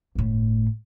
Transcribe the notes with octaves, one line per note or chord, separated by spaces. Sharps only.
G1 A2